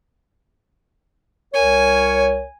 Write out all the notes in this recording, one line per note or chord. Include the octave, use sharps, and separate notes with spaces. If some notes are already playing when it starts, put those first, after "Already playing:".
C2 A#4 C#5 G#5